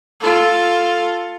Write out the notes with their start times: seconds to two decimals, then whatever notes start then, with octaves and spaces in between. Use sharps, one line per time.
0.20 F4 A4